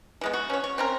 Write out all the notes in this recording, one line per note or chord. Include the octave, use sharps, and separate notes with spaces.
E3 G#3 B3
F#4
C#4 C#5
C#5
C4 C#4 A#4